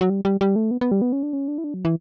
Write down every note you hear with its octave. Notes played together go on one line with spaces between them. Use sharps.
F#3
G3
G3
G3
A3
B3
B3
G3
B3
C#4
D4
C#4
D4
E4
D4
F#3
E3